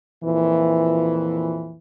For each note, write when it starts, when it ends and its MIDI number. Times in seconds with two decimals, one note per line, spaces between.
0.22 1.78 41
0.22 1.78 46
0.22 1.78 52